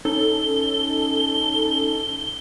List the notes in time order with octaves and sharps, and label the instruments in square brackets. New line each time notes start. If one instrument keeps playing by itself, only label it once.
[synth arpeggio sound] C#4 D#4 A4 [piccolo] G7